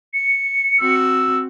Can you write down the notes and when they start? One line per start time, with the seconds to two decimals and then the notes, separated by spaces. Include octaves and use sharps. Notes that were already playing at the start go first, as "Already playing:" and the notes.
0.14 C#7
0.80 C4 F#4 E6